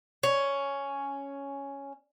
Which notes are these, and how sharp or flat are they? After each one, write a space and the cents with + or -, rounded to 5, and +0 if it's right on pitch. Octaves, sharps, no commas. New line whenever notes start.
C#4 +5